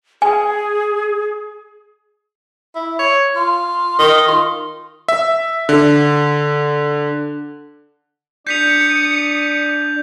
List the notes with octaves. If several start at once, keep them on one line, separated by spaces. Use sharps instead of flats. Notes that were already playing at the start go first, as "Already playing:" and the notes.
G#4 G#5
E4
C#5
F4
D#3
F4
E5
D3
D4 D5 D#6 G6 B6 C#7 F7